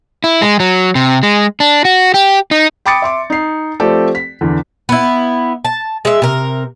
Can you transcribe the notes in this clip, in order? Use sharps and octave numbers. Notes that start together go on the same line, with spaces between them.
E4
G#3
F#3
C3
G#3
D4
F#4
G4
D#4
G5 B5 D6 D#6 A6 C#7
E5 C6 D6
D#4 C7
F3 A3 C4 G4 A4 D5
B6
E2 D3
B3 E4
A5
G#3 E5
C3 A#4